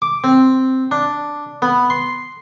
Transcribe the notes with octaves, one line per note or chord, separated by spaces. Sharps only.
D6
C4
D4
B3
C6